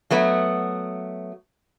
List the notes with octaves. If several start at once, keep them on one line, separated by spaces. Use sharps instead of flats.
F#3 A3 B3